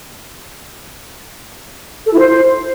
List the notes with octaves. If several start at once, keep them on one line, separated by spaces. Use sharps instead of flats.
A4
E4
C5